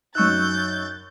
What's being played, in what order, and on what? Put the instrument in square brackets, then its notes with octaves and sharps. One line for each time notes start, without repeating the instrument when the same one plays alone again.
[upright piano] F#2 D#4 [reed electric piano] C#6 E6 F#6 [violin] G6 A6